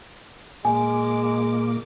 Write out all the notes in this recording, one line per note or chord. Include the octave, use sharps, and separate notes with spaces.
A#2 G#3 A#3 G#5 D6